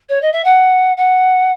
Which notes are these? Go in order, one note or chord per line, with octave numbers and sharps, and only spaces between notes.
C#5
D#5
E5
F#5
F#5